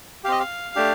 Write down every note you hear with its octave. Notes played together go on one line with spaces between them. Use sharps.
C4 G4 D#5 F5
F5
A3 D4 G4